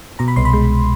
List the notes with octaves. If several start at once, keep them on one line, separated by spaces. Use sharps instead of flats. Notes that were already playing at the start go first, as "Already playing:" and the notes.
B2 A#5
B5
C2 C6
B5
G#3